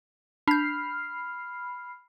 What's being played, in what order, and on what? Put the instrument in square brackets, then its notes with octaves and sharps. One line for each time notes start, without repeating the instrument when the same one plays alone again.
[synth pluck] D4 G6 [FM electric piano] B5 F6 C7